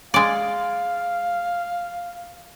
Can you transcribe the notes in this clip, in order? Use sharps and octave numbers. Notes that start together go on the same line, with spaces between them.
G#3 D5 F5